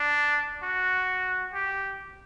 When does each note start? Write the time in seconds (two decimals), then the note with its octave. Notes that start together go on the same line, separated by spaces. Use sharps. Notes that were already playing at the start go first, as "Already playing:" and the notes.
Already playing: D4
0.63 F#4
1.53 G4